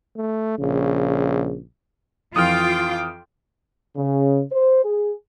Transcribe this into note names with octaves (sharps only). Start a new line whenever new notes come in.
A3
A#1 C#3
F2 E3 F4 G5 D6 D#6 F6
C#3
C5
G#4